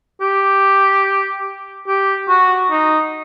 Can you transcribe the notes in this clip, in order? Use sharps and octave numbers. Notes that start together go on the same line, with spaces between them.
G4
G4
F#4
D#4